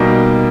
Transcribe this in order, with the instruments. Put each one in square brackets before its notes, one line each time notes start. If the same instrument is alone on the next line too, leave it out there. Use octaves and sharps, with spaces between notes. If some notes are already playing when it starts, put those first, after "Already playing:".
Already playing: [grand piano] B2 G3 A#3 D#4